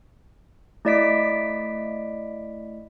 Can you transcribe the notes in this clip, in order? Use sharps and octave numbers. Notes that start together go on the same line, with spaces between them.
A3 E4 D5 D#5 B6 D7